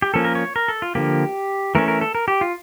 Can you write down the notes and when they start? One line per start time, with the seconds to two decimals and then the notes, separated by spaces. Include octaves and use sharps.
0.02 G4
0.14 F3 A#3 C#4 A4
0.24 A#4
0.35 C#5
0.56 A#4
0.68 A4
0.82 F4
0.95 D3 F3 A#3 G4
1.75 E3 A3 C#4 A#4
1.88 A#4
2.01 A4
2.15 A#4
2.28 G4
2.41 F4